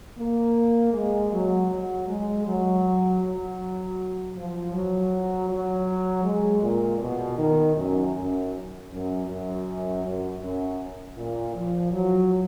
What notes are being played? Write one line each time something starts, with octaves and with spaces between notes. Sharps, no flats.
A#3
G#3
F#3
F#3
G#3
F#3
F#3
F3
F#3
F#3
G#3
A#2
B2
D#3
F#2
F#2
F#2
F#2
F#2
F#2
A#2
F3
F#3